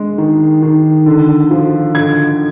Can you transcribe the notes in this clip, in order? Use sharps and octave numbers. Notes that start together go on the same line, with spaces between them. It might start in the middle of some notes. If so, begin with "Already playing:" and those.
Already playing: G#3 D4
D#3
D#3
D3
F3
D3 G#6